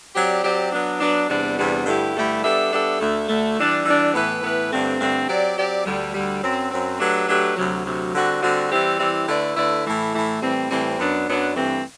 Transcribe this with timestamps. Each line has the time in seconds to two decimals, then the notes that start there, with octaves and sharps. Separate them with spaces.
0.16 F#3 C4 G4 D5
0.44 F#3 C4 G4 D5
0.72 F#3 B3 D4
1.00 F#3 B3 D4
1.29 E2 C3 G3 B3 D4
1.57 E2 C3 G3 B3 D4
1.86 G2 D3 A3 E4 G4
2.15 G2 D3 A3 E4 G4
2.43 G3 B3 D4 A4 E5
2.72 G3 B3 D4 A4 E5
3.00 D2 D3 A3
3.29 D2 D3 A3
3.58 E3 G3 D4
3.86 E3 G3 D4
4.14 A2 E3 B3 E4 B4
4.43 A2 E3 B3 E4 B4
4.71 G2 D3 A3 C4
5.00 G2 D3 A3 C4
5.28 F#3 C4 G4 D5
5.58 F#3 C4 G4 D5
5.86 D2 D3 G3
6.14 D2 D3 G3
6.42 F#2 F#3 C4
6.71 F#2 F#3 C4
6.99 F#3 A3 D4 G4 B4
7.28 F#3 A3 D4 G4 B4
7.56 D2 C3 F#3
7.85 D2 C3 F#3
8.14 D3 G3 C4 F#4
8.42 D3 G3 C4 F#4
8.71 E3 G3 C4 E4 G4
8.99 E3 G3 C4 E4 G4
9.27 D3 A3 E4 B4 D5
9.56 D3 A3 E4 B4 D5
9.85 A2 E3 A3
10.13 A2 E3 A3
10.42 A2 E3 G3 C4
10.70 A2 E3 G3 C4
10.99 F#2 F#3 B3 D4
11.28 F#2 F#3 B3 D4
11.56 G2 E3 A3 C4